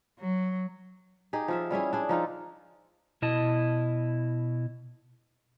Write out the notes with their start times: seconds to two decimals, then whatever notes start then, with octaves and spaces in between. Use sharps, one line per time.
0.19 F#3
1.33 D#4 G4 G#4
1.48 F3 F4 E5
1.70 G3 C#4 E4 G#4
1.93 D4 G#4
2.09 F3 D#4 F4 A4
3.22 B2 E4 D#5 A5